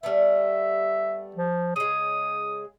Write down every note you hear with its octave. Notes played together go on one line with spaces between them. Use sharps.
G3 A3 B3 E5
F3
C#3 G#3 D#6